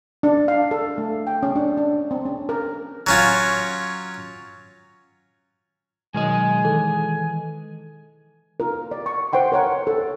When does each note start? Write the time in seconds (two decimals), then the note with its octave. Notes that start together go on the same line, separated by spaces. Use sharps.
0.23 D4
0.48 F5
0.71 A4
0.98 A3
1.27 G5
1.43 C#4
1.56 D4
1.77 D4
2.11 C4
2.25 C#4
2.49 A#4
3.07 F#3 C#4 F4
6.14 B2 D#3 F#3 G#3 D#5 G#5
6.64 D#3 E3 A4
8.60 F4 A#4
8.91 D5
9.06 C#6
9.33 C5 F#5 G5 C6
9.52 A#4 C#5 F#5
9.87 A4